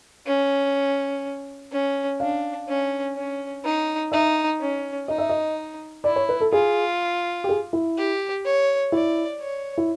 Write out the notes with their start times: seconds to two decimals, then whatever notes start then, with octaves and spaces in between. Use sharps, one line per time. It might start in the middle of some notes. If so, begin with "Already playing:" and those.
0.27 C#4
1.72 C#4
2.20 D4 F5
2.68 C#4
3.15 C#4
3.64 D#4
4.12 D#4 E5
4.60 C#4
5.08 D#4 D#5
5.18 E5
5.29 D#5
6.04 E4 D5
6.16 C#5
6.29 B4
6.41 A4
6.52 F4 G#4
7.44 G4
7.49 G#4
7.73 E4
7.97 G4
8.45 C#5
8.92 E4 D5
9.40 C#5
9.78 E4